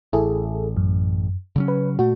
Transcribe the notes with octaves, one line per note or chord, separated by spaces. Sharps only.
A1 E4 G#4 A4
F#2
C#3 F#3 C#4
B4
A#2 A3 F#4